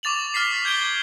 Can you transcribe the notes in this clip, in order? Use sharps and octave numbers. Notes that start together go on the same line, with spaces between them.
C#6 D6 A6 F7 F#7
D6 F6 A6 B6 C7
G6 G#6 D7 G7